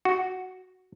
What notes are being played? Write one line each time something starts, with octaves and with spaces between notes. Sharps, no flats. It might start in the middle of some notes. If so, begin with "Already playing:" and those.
F#4